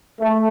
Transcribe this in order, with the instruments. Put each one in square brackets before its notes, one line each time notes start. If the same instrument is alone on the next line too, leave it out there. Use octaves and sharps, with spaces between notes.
[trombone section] A3